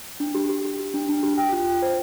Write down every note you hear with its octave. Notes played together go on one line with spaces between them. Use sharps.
D4
G4
G4
G4
G4
D4
D4
G4
G5
F4
G5
C5